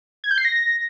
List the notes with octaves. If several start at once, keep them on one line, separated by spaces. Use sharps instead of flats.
G#6
G6
C7
A#6